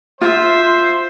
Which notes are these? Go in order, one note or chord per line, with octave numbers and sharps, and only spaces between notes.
F4 C5 E5